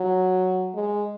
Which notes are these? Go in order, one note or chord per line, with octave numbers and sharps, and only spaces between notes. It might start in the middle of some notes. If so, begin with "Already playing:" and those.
Already playing: F#3
G#3